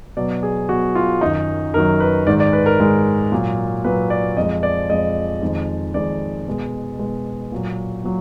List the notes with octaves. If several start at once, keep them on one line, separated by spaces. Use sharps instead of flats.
B2 F#3 D5
G#4
B2 F#3 F#4
F4
F#2 D#3 F#3 D#4
F#2 D#3 F#3 A#4
B4
G#2 D#3 G#3 D5
D5
B4
A#4
G#2 D#3 G#3
A#2 F#3
A#2 F#3 B4
D5
F2 F3 G#3 D#5
D5
F2 F3 G#3 D#5
F2 D#3 G#3
F2 D#3 G#3 D5
B2 G#3
B2 G#3
A#2 F#3
A#2 F#3